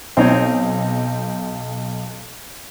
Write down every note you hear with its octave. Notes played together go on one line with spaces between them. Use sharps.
B1 C4 D#4 C#5